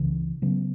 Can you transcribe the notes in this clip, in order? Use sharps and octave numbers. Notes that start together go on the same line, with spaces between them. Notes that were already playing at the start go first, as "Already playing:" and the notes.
Already playing: C#2 C#3 E3
C#3 F#3 B3